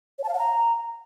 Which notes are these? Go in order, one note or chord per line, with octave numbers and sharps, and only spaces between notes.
C#5
A5
F5
F#5
A#5